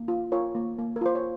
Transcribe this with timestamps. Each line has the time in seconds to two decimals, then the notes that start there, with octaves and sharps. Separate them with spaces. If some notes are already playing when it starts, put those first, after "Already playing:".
Already playing: A#3
0.08 F4
0.32 F4 A#4 C#5
0.55 A#3
0.79 A#3
0.96 A#4
1.01 F4 C5
1.15 C#5